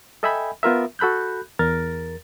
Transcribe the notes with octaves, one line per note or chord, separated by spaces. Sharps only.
A4 D#5 E5 G5 G#5 B5
B3 F4 A#4 E5
F#4 A4 B5 F#6 G6
E2 A#4 A6